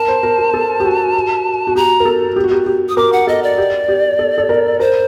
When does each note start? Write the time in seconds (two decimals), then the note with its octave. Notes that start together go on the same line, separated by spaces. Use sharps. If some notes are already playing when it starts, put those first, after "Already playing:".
Already playing: A#4 A5
0.08 C5
0.23 A#4
0.38 A#4
0.54 A4
0.80 G4
0.85 F#4
1.67 F#4
1.76 G4 A#5
2.00 A#4
2.05 A4
2.36 G4
2.44 F#4
2.51 G4
2.66 G4
2.89 D#6
2.97 A#4 D6
3.12 F#5
3.27 A4 D#5
3.43 D5
3.58 G4
3.88 G4
4.19 A4
4.38 A4
4.49 A#4
4.80 A#4 C5